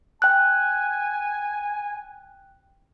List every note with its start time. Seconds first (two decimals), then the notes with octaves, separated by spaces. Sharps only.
0.22 G5 G#5 F#6